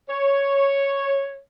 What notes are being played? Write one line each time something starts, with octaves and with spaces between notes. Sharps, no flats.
C#5